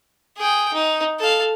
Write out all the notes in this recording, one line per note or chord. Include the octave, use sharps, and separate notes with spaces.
G#4 G5
D#4
A4 F5